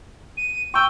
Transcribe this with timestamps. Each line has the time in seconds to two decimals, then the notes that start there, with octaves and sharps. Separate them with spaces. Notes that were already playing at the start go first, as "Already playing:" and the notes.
0.37 D#7
0.74 G5 C#6 E6